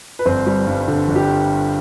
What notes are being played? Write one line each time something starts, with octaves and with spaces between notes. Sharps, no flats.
B4
G1 C4 C5
G3
G2
D3
G1
G4